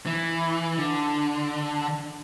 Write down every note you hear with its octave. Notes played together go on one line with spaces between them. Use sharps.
E3
D3